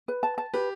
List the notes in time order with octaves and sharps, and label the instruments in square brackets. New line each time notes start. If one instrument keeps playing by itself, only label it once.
[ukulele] B4
A5
A5
[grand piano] G4 [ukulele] B4